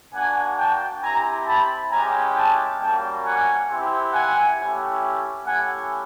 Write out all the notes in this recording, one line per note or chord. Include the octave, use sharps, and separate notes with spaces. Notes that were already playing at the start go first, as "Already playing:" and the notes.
A#3 D4 F#4 F#5 G#5
G5 A5
C4 E4 G4 G#5 A#5
A5 B5
G#3 C#4 E4 G4 G#5 A#5
G5 A5
G3 A#3 C#4 F#4 G5 A5
F#5 G#5
C4 E4 G4
F#5 G#5
A3 C#4 E4 G4
A3 C#4 E4 G4 F#5 G#5